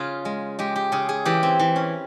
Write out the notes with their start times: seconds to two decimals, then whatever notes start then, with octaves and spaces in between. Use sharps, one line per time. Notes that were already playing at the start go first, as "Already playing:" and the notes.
Already playing: C#3 F4 G#4
0.25 G#3
0.59 G#3 G4
0.76 G4
0.92 C#3 G#4
1.09 G#4
1.25 E3 G4
1.43 C4
1.59 E3
1.76 C#4